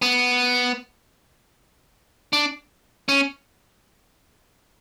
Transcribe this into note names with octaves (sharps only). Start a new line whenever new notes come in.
B3
D4
C#4